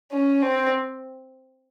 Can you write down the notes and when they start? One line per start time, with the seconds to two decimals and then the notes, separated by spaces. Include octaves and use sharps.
0.12 C#4
0.42 C4